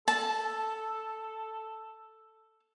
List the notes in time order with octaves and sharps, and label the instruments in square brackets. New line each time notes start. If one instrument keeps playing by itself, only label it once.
[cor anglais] A4 [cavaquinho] A5